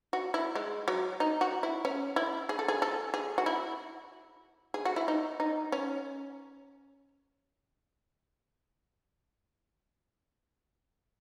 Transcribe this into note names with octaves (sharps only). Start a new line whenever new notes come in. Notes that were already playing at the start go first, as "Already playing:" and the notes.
F#4
E4
G#3
F#3
D#4
F#4
E4
C#4
E4
G#4
A4
G#4
A4
G#4
F#4
E4
G#4
F#4
E4
D#4
D#4
C#4